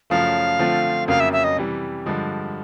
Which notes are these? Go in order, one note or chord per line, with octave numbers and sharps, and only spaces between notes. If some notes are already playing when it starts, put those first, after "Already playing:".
F#2 C#3 F3 A3 F5
D3 F3 A3 C4 F4
F2 C#3 F#3 A#3 F5
E5
E5
D#5
C3 E3 G3
G2 D3 F3 G#3